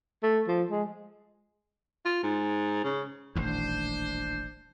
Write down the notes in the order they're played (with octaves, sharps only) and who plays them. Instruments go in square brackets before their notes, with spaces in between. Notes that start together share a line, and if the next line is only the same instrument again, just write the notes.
[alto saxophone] A3
F3
G#3
[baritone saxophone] F4
G#2
C#3
[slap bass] D#1 A1 D#2 [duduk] D4 [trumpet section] C5